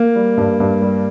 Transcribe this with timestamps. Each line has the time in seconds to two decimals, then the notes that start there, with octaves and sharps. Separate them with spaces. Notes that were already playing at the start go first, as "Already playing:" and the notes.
Already playing: A#3
0.15 G3
0.37 G2
0.60 G2
0.82 G3